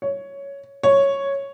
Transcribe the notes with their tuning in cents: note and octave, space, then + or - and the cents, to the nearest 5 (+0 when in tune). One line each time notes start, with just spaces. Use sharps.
C#5 +5
C#5 -5